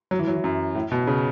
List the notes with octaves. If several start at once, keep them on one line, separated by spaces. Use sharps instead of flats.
F#3
E3
F#3
E3
F#2
A2
B2
C#3